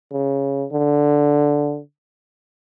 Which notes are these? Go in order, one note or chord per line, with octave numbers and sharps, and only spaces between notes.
C#3
D3